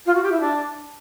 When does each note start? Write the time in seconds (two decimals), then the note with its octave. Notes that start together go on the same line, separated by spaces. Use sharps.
0.06 F4
0.14 F#4
0.23 G4
0.32 E4
0.40 D4